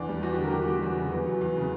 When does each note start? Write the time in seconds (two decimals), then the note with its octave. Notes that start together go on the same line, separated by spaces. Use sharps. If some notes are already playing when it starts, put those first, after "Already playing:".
Already playing: E2 D4
0.09 G3
0.23 E2 F#4
0.33 G4
0.38 D3
0.44 A#4
0.52 E2 G4
0.62 F#4
0.68 G3 G4
0.83 E2 F#4
0.97 C#3
1.11 E2 B3
1.27 F#3
1.41 E2
1.56 C#3